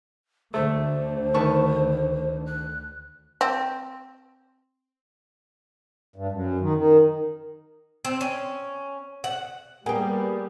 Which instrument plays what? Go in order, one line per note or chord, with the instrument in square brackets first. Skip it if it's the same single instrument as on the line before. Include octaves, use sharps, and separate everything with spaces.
[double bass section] D2 D3 [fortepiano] A3 [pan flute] C5
[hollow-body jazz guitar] D#3 A3 [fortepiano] B4 A5 C#6
[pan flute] F#6
[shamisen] C4
[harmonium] G2
F#2
D#3
D#3
[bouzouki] C4
C#4
F#5
[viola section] G3 [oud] A#3 G4 [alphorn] B3 [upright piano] G#4